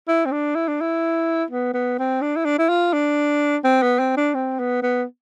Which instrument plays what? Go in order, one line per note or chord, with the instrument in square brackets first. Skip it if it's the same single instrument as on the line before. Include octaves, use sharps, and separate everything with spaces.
[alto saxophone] E4
C4
D4
E4
D4
E4
B3
B3
C4
D4
E4
D4
E4
F4
D4
C4
B3
C4
D4
C4
B3
B3